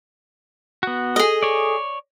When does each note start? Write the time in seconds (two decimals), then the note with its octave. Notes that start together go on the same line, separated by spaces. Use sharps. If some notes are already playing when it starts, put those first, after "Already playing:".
0.83 B3 F#4
1.16 G#4 A4 D#5
1.43 C#5 D5